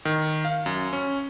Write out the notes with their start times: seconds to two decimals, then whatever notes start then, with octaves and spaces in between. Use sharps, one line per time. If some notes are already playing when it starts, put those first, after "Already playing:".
0.05 D#3
0.45 F5
0.66 F#2
0.93 C#4